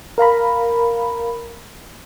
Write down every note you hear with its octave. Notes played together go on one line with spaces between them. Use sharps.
A#4 F5 A#5 B5